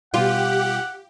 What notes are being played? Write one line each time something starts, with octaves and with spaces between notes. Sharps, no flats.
B2 G3 F4 G4 F#5